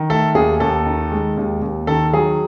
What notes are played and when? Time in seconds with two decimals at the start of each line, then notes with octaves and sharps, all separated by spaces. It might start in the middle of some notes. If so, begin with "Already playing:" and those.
Already playing: D#3
0.10 A3 A4
0.35 D#2 G#4
0.60 D#2 A4
0.86 D#3
1.12 G#3
1.37 D#2
1.62 D#2
1.87 D#3 A4
2.13 F#3 G#4